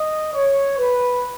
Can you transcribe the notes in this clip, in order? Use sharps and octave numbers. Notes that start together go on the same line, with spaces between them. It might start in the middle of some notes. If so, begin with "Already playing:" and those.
Already playing: D#5
C#5
B4